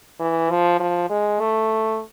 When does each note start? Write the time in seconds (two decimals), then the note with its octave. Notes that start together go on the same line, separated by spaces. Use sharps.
0.20 E3
0.50 F3
0.79 F3
1.10 G#3
1.40 A3